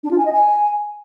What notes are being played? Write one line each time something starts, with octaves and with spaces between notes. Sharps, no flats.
D4
F4
G#5
D#5
G#5